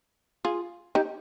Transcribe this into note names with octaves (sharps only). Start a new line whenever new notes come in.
F4 G#4
D#4 G4